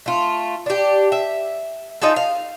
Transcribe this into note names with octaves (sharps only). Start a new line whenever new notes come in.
A3 F4
D4 G4
E5
D#4 F4 G#4 A4
F5